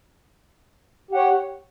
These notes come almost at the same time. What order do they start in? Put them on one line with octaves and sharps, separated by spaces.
G4 F#5 C#5